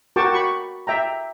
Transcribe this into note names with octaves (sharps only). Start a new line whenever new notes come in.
F#4 A#4 G5 A5 C#6 D6
B5 C#6
E5 G5 A#5